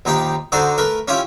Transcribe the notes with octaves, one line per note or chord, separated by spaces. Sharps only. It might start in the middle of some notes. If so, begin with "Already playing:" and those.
A#1 D#2 D#4 G4 G5
D3 D4 D#4 F#4 A4 C5
A3 A#4 B4
C#4 E4 F4 G4